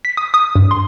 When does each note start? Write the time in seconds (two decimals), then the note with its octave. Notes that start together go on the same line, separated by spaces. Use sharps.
0.05 B6
0.17 D#6
0.34 D#6
0.55 G2
0.71 C6